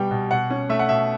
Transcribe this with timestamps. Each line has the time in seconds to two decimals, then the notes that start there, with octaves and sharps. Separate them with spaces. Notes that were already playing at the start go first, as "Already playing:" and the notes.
Already playing: B2 G3 B3 G5
0.11 B2
0.31 B2 F#5
0.50 C#4
0.69 A3 E5
0.79 F#5
0.89 B2 E5